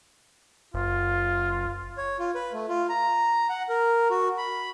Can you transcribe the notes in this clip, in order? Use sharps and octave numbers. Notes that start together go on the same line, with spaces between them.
F#1 F4
C#5
F4
B4
A3
F4
A#5
F#5
A#4
F#4
B5